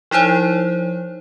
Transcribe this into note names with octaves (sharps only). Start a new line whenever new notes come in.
F3 D#4 E4 C5 C#5